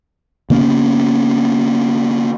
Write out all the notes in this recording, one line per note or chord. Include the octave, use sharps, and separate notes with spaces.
C#3 A#3 B3 C#4